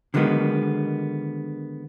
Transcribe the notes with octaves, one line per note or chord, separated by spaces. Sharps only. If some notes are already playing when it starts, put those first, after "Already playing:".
D3 D#3 F#3 G#3 B3